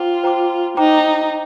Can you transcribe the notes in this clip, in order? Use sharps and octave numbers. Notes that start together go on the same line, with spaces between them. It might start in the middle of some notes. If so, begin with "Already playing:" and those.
Already playing: F4 C5 G5 A#5 D6
C5 G5 A#5 D6
D#4 C5 G5 A#5 D6